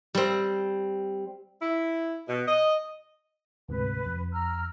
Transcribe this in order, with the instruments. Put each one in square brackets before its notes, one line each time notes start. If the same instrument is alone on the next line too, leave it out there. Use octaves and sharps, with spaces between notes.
[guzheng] G3 C4
[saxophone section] E4
B2
D#5
[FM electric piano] D2 G#2 C3 [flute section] B4
[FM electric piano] F2
[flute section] A#5 E6 F6